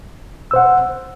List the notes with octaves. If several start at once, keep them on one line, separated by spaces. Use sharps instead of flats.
C5 F#5 E6